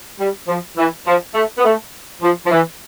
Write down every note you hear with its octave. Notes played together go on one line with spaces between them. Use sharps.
G3
F3
E3
F3
A3
B3
A3
F3
F3
E3